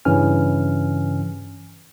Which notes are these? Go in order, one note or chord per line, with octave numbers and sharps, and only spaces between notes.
G2 C#3 E3 C#4 G#5 F6